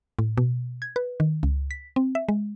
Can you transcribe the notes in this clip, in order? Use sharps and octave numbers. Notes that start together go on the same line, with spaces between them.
A2
B2
G#6
B4
D#3
C#2
B6
C4
E5
G#3